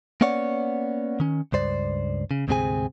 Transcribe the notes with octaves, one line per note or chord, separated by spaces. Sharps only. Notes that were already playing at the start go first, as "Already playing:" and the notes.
A#3 B3 C#4 C#5 D5 F#5
D#3 C#4
C#2 G2 C5 D5
C#3
D2 G#2 C3 C4 G#4 G#5